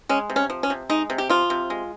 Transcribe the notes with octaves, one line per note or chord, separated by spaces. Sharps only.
G#3 C#4
C3
C#4
F3
C#4
C3
G#3 D#4
C3
G4
F3 F4
C3
G#3